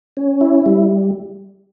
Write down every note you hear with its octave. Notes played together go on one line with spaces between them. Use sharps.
C#4
E4
G3